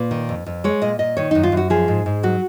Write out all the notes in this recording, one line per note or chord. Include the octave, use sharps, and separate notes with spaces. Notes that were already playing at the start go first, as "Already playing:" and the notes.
Already playing: A#2 B4
D#3
F2
F2
G#3 C#5
A#2 D#5
A#2 D#5
D#3 C#5
F#2 D#4
F4
F#2 F#4
F3 G#4
G#2
G#2
F#3 F#4